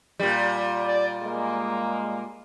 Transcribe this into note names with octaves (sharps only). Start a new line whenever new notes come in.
A#2 G3
D5
G#3 A#3